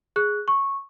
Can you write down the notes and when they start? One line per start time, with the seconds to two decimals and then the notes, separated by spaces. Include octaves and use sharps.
0.16 G#4 F#6
0.48 C#6